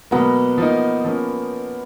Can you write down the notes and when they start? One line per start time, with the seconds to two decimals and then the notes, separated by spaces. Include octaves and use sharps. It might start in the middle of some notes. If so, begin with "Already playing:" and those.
0.11 B2 F#3 A#3 B3
0.58 F3 A#3 D#4
1.05 F3 A#3 C#4